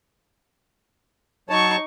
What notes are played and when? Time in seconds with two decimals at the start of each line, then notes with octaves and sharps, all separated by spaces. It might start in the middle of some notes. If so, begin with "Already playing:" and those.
1.50 F#3 D#4 C#5 A5 C#6